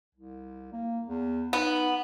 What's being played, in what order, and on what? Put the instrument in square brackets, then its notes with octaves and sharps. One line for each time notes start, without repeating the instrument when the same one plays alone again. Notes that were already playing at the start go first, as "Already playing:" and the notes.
[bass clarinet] C2
A#3
E2
[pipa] B3 [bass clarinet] D#4